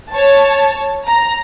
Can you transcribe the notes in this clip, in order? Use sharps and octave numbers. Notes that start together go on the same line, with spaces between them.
C#5 A5
A#5